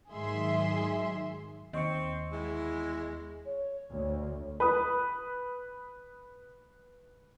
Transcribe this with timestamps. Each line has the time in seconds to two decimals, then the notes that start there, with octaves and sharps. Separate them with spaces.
0.11 G#2 D#3 F#3 G#4 E5 C6
1.73 D#2 C4 D#5 C#6 C#7
2.32 E2 G#3 E4
3.45 C#5
3.90 D2
4.60 B4 D#6